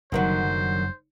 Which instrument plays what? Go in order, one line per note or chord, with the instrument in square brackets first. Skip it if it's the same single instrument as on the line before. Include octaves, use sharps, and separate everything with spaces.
[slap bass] F#1 G3 [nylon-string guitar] D3 D#3 F#3 [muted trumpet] C5